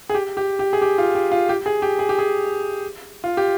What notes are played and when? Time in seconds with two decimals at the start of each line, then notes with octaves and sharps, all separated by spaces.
0.10 G#4
0.15 G4
0.37 G4
0.59 G4
0.73 G#4
0.82 G4
0.98 F4
1.15 G4
1.32 F4
1.49 G4
1.66 G#4
1.82 G4
1.99 G#4
2.09 G4
2.19 G#4
3.24 F4
3.37 G4